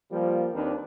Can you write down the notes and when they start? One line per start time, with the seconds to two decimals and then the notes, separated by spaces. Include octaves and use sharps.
0.11 F3 G3 A#3
0.54 D#2 D#3 C4 D4 G4 B4